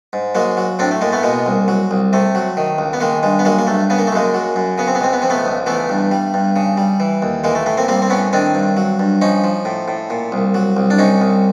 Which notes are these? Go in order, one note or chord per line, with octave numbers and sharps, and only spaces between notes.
G#2
F#3 G#3 A#3
F#3
A2 C4 D4
A3
A2 G#3 A#3
A3 B3
B2 G#3 A#3
C2
F#3
C2
C3 A3
F#3
D#3
C#2
B3
D#3 G#3 A#3
G2 G#3
B3
F#3 G#3 A#3
A#3
G2 A3
C#3 B3
A#3
A3
F#2 G#3 A#3
F#3
F#2
C#3 B3
C4
B3
C#2 C4
B3
F3 C4
A3 B3
C#2
E3 A3 B3
G2
G3
G2
C#3
G3
E3
D#2
E3 G#3 A#3
A3
A2 A3
A#3 C4
G3 A#3 C4
C4
A2 B3 C#4
D#3 C4 D4
G2
F#3
G2
F3 C#4 D#4
F3
A2
A2
A#2
C2
F#3
C2
D4
C3 C#4 D#4
C2